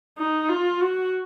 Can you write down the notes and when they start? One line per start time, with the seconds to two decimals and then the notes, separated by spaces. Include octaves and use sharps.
0.18 D#4
0.49 F4
0.81 F#4